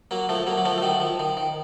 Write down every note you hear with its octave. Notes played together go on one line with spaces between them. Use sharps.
F#3 A#3
F3 A3
F#3 A#3
F#3
F3 A3
A3
D#3 F#3
F3
D#3
D#3